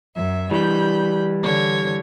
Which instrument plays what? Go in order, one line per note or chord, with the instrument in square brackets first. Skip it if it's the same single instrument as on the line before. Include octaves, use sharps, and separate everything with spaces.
[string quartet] F#2 E5
[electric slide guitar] E3 G3 [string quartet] B5 G6
[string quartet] D3 C#5 G#6